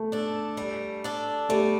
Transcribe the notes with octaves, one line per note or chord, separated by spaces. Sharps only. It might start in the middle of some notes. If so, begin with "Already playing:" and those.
Already playing: A3
D4 A4
G3
D4 A4
G3 A3